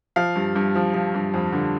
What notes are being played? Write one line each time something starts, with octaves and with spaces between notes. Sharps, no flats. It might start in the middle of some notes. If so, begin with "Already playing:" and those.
F3 F5
G2
G2
F3
F3
G2
F2
D3